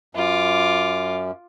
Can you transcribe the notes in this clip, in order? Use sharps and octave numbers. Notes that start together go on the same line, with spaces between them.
F#2 F4 D6